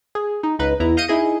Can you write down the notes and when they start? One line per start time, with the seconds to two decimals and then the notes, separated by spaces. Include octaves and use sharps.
0.15 G#4
0.43 D#4
0.59 C#2 D#4 B4
0.80 E2 B3 E4 A#5
0.97 D#5 F5 G6 A#6 C#7 D#7
1.08 D#4 E4 G#4 D#5